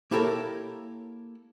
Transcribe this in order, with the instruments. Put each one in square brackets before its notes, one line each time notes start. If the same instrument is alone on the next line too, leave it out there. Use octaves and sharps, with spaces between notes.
[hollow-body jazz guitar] A#3 E4 G4 A4 A#4 C#5